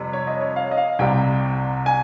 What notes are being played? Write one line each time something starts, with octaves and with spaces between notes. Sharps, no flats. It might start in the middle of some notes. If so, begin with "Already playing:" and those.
Already playing: F2 C3 G3
C#5
D#5
C#5
F5
D#5
F5
C2 C3 G3 G5
G#5